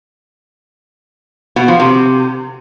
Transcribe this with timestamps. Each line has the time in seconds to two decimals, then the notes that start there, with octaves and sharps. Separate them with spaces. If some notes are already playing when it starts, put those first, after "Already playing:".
1.56 B2
1.68 F3
1.80 C3